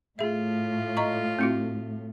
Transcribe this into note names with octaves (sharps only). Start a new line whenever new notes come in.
A2 A3 F4 G#4 E5
D#5 A#5 C#6
C4 E4 F#4